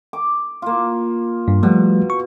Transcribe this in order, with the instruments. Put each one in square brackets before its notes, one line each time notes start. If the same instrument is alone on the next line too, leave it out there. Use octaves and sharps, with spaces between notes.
[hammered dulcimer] D6
A#3 F4
[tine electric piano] G2
[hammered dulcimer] B2 [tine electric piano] F3 G3 A3
[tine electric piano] C#6